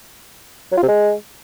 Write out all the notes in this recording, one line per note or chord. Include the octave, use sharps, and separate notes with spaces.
F#3
F4
C3
G#3